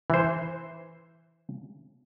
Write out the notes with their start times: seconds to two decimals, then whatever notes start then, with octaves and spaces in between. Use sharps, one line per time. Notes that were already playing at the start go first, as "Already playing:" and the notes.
0.10 E3 C5